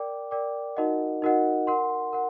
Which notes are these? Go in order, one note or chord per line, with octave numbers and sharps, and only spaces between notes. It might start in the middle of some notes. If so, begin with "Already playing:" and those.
Already playing: A#4 D5 G5 D6
A#4 D5 G5 D6
D#4 F#4 A#4 D#5 F#5
D#4 F#4 A#4 D#5 F#5
A#4 F#5 C6
A#4 F#5